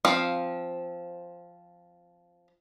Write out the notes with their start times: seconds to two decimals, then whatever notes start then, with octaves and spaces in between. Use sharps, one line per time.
0.05 F3 C4 F5